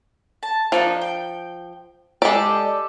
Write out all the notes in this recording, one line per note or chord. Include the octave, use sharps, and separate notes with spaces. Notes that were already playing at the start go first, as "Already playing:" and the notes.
A5
F3 A#3 D4 D#4
G5
G#3 G4 A4 D5 D6